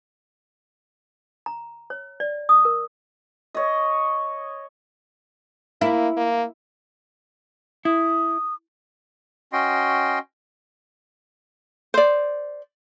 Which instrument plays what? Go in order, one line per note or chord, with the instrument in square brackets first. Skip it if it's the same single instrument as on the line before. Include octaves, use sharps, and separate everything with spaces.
[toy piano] A#5
C#5
D5
D#6
A#4
[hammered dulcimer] C#5 D#5
[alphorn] A#3 [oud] E4
[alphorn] A#3
[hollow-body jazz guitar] E4 [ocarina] D#6
[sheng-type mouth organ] C#4 F#4 D#5 G5 C6
[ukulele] C5 D5